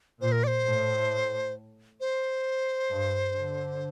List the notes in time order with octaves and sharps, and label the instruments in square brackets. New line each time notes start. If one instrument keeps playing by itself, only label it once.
[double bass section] A#2 [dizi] C5
[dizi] A#4
D5
C5
[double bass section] A2
[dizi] C5
[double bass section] G2
D3